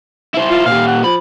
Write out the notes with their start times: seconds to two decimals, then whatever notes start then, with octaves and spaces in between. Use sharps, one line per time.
0.34 E4 C5
0.50 F4
0.66 A#2 G4 F5
0.87 F#5
1.04 F3 B5